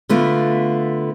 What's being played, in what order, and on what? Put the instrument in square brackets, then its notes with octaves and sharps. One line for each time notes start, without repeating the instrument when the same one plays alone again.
[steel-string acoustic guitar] D3 A3 B3 F4